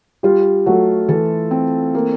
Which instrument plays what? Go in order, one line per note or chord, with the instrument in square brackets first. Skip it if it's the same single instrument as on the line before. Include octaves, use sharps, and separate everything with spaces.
[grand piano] G3 G4 [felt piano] F4
[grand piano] F#3 F#4 [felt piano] A3
[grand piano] E3 E4 [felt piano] A4
[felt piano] C4
A#3